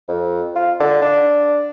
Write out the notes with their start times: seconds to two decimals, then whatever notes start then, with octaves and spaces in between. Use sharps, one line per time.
0.08 F2
0.56 F4
0.80 D3
1.02 D4